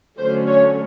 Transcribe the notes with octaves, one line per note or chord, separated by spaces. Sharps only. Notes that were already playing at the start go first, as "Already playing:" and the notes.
D3 F#3 A3 C#4 C5
C#5